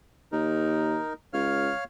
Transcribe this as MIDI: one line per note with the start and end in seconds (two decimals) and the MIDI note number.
0.32 0.98 39
0.32 1.13 63
0.32 1.13 70
1.33 1.70 37
1.33 1.84 73
1.33 1.84 77
1.33 1.84 89